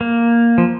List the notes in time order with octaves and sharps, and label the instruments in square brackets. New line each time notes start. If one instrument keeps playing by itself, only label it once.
[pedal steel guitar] A#3
F3